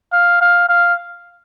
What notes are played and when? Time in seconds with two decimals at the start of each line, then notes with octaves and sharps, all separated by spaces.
0.13 F5
0.41 F5
0.69 F5